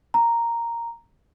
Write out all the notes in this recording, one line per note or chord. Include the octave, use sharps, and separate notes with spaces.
A#5